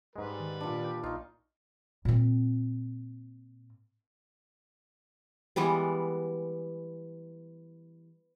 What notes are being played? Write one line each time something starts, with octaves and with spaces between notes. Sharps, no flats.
G#2 G3 G#3 B4
D#3
A#2 D4
G5
B1 D#4 F4 C#6
A#2 C4
E3 G3 G#3 B3